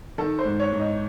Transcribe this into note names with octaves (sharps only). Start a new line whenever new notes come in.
D#3 A4
C5
G#2
C#5
G#2
D#5